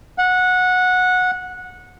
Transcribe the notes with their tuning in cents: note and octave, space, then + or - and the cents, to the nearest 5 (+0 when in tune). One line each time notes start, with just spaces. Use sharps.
F#5 -15